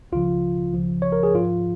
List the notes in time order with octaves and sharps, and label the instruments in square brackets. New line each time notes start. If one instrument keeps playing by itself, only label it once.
[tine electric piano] C#2 C#3 F3 F4
C#2 C#3 F3
C#5
A#4
G#4
G#2 F3 F4